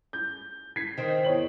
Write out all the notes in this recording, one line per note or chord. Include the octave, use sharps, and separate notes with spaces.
G6
G#6 B6 C7
D#3 C4
E2 C#5 F#7